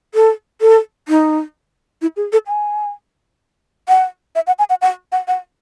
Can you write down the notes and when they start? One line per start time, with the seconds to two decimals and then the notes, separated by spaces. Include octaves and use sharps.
0.15 A4
0.61 A4
1.08 D#4
2.02 E4
2.16 G#4
2.33 A4
2.47 G#5
3.88 F#5
4.35 E5
4.47 F#5
4.59 G#5
4.70 F#5
4.82 F#5
5.12 F#5
5.28 F#5